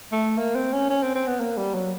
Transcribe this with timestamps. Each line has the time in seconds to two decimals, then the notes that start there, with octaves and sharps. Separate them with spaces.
0.12 A3
0.38 A#3
0.55 C4
0.73 C#4
0.90 C#4
1.02 C4
1.15 C4
1.27 B3
1.40 A#3
1.57 G3
1.75 F#3